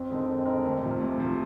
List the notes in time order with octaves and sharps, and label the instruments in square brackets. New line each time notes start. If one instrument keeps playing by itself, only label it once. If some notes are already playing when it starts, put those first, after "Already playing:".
Already playing: [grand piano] F2 [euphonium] C4
[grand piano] D3 G#3 D#4 A#4
F2
D3 G#3 D#4 A#4
D2
C3 F3
[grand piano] D2 [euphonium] C4
[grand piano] C3 F3